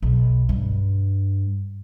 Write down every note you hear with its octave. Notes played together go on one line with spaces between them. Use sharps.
B1
G2